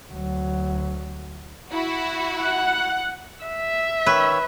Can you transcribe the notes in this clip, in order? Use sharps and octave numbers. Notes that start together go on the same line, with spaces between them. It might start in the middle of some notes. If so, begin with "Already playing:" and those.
D2 F#3
E4 F#4
F#5
E5
D#3 B4 C#5 E6